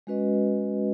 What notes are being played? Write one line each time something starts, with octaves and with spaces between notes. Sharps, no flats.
G#3 C#4 F#4 B4 D#5